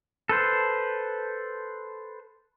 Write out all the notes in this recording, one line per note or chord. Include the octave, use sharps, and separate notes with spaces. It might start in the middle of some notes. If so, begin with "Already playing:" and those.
A4 B4 C5